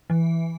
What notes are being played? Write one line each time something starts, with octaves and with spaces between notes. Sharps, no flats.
E3